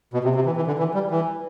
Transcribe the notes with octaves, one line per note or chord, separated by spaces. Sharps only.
B2
C3
C3
E3
E3
D3
E3
G3
E3